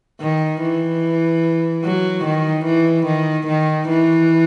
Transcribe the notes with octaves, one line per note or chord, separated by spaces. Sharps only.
D#3
E3
F#3
D#3
E3
D#3
D#3
E3